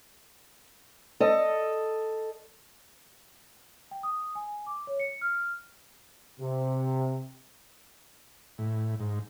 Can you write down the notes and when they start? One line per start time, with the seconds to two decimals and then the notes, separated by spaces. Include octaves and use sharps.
1.20 A4 D#5
3.91 G5
4.03 D#6
4.35 G#5
4.67 D6
4.87 C#5
5.00 C#7
5.21 F6
6.40 C3
8.58 A2
9.00 G#2